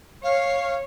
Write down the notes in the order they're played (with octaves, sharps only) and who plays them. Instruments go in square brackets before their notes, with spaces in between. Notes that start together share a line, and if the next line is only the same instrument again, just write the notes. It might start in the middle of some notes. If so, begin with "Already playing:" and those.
[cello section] C#5 [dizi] F5